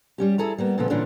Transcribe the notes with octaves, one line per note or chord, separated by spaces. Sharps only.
G3 C#4 G4
E4 G#4 A4 A#5
G3 A#3 B3
A#2 C#3 F3 B3 A4
A#2 D3 E3 C#4 D4 F4